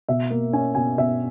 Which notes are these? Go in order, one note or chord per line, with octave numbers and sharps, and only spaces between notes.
B2 E5
A#3
C#4 G#5
B2 G#5
B2 E5